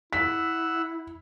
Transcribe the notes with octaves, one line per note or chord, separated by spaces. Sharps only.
E4 F#5 E6 B6